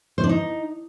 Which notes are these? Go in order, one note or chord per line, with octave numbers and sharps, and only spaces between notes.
C5
D4
D#4